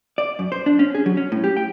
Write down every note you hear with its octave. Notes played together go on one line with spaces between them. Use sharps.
D5
F#2
C5
D4
C#4
G#4
F#3
C#4
A2
G4
G5